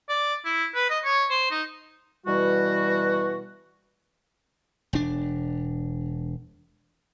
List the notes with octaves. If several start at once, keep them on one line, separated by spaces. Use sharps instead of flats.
D5
E4
B4
D#5
C#5
C5
D#4
B2 E3 G3 F#4
E1 D4